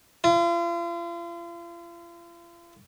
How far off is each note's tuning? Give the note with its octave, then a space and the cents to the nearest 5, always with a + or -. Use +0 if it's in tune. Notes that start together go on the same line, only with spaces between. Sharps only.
F4 -40